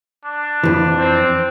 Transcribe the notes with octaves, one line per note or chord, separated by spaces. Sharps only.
D4
F2 E3
C4